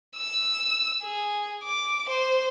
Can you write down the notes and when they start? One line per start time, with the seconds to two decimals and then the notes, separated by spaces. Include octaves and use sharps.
0.17 E6
1.03 G#4
1.64 D6
2.09 C5